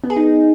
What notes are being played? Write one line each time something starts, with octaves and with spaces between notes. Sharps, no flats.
B3
G#4
D#4